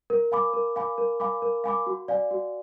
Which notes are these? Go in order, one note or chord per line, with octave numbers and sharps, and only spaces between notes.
A#4
F5 G#5 B5 D6
A#4
F5 G#5 B5 D6
A#4
F5 G#5 B5 D6
A#4
F5 G#5 B5 D6
F#4
D5 F5 G#5
F#4